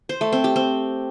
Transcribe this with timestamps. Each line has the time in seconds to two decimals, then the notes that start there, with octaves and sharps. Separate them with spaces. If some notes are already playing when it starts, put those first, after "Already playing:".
0.09 C5
0.21 A3
0.32 C4
0.44 G4
0.56 C4